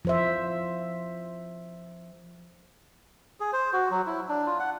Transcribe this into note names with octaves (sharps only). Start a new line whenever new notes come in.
F3 C5 E5
G#4
C5
F#4
F#3
E4
D4
F4
F#5